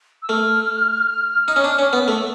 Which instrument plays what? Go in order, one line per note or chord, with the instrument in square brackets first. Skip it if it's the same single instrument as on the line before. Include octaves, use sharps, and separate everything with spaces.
[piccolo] E6
[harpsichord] A3 [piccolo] F6
[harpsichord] D#4
C#4
D4
C#4
B3
A3